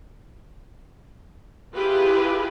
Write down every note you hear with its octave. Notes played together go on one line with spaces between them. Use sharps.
E4 F4 G4 G#4 B4